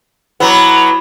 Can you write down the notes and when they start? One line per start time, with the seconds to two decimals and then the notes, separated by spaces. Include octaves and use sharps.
0.40 F#3 B3 E4 B5 D6